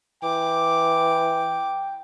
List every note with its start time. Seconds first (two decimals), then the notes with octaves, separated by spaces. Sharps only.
0.23 E3 G5 D6